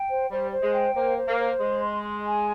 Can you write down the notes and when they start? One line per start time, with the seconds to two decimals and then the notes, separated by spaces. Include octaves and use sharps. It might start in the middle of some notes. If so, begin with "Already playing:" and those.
Already playing: G5
0.09 C5
0.30 G3 C5
0.52 C5
0.62 G#3
0.74 G5
0.95 A#3 C5
1.17 C5
1.27 A#3
1.38 C5
1.59 G#3 C6
1.82 C6
2.04 C6
2.25 G#5